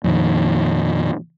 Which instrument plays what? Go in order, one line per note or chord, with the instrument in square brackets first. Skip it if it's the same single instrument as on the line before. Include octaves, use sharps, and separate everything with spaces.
[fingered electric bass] F2 A#2 D#3